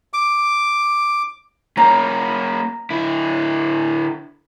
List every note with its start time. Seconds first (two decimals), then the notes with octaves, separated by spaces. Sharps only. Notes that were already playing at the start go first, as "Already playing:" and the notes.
0.13 D6
1.77 A#3 C#4 A#5
2.90 D3 E4